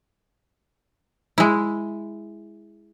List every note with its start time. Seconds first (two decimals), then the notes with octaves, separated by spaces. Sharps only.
1.38 G#3 E4